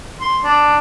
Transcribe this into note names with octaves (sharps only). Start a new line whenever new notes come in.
C6
D4